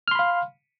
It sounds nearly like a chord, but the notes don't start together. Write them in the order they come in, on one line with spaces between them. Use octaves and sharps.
F6 C6 B5 F5